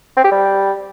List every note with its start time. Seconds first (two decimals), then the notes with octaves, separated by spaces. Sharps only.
0.17 C4
0.24 G4
0.31 G3